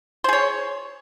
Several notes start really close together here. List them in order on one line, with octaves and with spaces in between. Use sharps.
C5 G#4 C#5